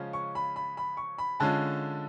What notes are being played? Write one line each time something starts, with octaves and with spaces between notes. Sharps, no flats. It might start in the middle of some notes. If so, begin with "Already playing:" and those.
Already playing: C#3 F3 G#3 C#4 F4
C#6
B5
B5
B5
C#6
B5
D3 G#3 C#4 F4 A5